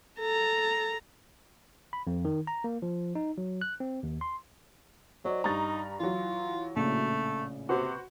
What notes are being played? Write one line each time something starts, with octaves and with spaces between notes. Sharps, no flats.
A4 A#5
B5
F2
D#3
A#5
A#3
F3
D#4
F#3
F#6
C4
D#2
C6
F#3 C5 D5 D#5
G2 D#4 A#5 C#6 A6
E3 F#3 F4
A#1 A2 C#3 A3
C3 F#4 B4 C5